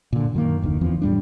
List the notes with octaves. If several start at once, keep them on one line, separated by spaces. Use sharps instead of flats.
A#2 D3
F#2 D#3 A#3
F#1 D#2 D3 D#3
E2 E3 F3 C4
A2 G3 D4